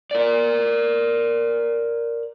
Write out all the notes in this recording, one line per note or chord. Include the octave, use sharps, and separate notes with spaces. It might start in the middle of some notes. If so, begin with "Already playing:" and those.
A#4 D5